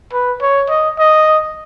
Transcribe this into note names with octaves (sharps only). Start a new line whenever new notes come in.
B4
C#5
D#5
D#5